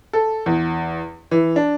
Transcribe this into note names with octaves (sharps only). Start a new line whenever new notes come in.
A4
E2
E3
D4